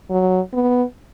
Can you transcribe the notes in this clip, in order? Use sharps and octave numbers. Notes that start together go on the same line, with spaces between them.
F#3
B3